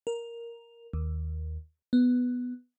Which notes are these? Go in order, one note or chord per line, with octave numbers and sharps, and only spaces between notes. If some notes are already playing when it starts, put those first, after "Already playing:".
A#4
D#2
B3